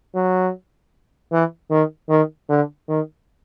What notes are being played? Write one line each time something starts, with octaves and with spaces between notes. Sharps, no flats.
F#3
E3
D#3
D#3
D3
D#3